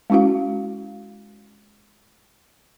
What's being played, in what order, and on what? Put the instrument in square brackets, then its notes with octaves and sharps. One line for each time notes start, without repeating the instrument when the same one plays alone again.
[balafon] G#3 C#4 E4 F#4 F5